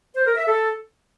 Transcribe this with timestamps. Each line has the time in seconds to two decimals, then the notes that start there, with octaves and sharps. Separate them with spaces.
0.16 C5
0.26 A#4
0.37 E5
0.48 A4